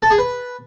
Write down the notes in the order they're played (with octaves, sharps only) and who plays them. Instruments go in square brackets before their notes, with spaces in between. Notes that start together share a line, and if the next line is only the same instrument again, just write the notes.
[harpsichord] A4
G#4
B4